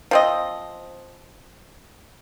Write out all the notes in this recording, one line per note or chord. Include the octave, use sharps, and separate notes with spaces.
F3 C4 D#5